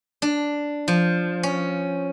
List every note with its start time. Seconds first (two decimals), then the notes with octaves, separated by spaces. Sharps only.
0.22 D4
0.88 F3
1.43 C#4